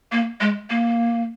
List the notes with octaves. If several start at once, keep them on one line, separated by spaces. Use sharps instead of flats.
A#3
G#3
A#3